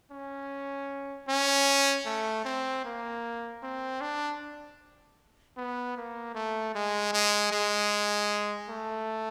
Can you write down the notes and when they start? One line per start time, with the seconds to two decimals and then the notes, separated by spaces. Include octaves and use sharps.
0.12 C#4
1.29 C#4
2.06 A3
2.45 C4
2.85 A#3
3.63 C4
4.01 D4
5.57 B3
5.97 A#3
6.35 A3
6.75 G#3
7.13 G#3
7.52 G#3
8.70 A3